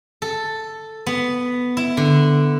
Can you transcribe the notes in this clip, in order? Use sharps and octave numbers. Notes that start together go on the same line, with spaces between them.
A4
B3
E4
D3